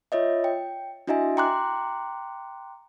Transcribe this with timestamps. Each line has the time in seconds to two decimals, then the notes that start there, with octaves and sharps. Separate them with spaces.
0.12 F4 C#5 D#5 E5
0.44 G5
1.07 D4 E4 F#4 D#5 E5 G#5
1.37 G5 A#5 C6 D6 F#6